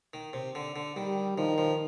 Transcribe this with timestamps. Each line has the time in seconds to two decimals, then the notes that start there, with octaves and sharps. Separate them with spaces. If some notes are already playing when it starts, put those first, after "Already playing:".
0.14 D#3
0.33 C3
0.55 D3
0.76 D3
0.96 D#3 G3
1.38 D#3 F3
1.58 F3